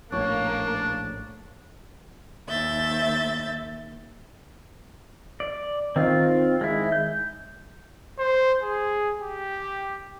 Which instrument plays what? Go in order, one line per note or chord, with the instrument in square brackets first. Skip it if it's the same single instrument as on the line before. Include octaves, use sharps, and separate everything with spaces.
[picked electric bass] A#1 A2 [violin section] A#3 [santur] C#4 [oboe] D4
[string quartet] D#2 E5 G6 A6
[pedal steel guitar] D5
[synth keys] D#3 [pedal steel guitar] C4 F4
[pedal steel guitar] G#3 E4
G6
[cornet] C5
G#4
G4